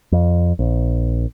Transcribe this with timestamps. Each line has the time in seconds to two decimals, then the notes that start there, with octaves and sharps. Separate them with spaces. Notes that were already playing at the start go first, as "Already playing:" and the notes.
0.12 F2
0.59 A#1